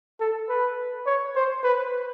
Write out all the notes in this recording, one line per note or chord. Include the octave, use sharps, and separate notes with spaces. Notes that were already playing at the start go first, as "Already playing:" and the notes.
A4
B4
C#5
C5
B4